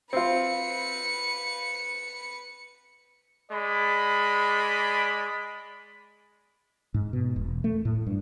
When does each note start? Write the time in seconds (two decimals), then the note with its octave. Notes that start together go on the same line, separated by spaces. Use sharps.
0.13 C4 F4 B4 C#7
3.52 G#3 D5 B5
6.94 G#2
7.13 B2
7.36 E1
7.64 A3
7.85 A2
8.07 G2